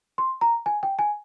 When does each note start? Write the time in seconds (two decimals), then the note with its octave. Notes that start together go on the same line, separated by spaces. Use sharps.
0.18 C6
0.41 A#5
0.66 G#5
0.83 G5
0.99 G#5